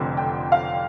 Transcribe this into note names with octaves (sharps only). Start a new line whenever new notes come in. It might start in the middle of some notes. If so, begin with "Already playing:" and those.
Already playing: F1 F2 D3 F3
G5
F5